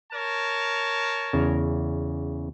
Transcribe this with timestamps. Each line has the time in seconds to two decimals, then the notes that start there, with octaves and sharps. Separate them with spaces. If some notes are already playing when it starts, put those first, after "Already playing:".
0.12 A#4 C#5 A5
1.33 E2 C#3